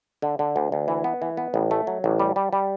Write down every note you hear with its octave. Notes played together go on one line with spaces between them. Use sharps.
D3
D3
D2
D2
E3
B3
E3
B3
A1
A3
F#3
A1
G3
G3
G3